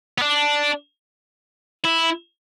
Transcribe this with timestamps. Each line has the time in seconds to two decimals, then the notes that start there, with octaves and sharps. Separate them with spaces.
0.18 B3
0.22 D4
1.84 E4